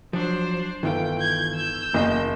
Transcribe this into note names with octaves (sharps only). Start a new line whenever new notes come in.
F3 F#3 D4 C5
G1 D#3 E3 F4 G5
G6 G#6
E6 G6
F#1 E2 E3 A#3 D#5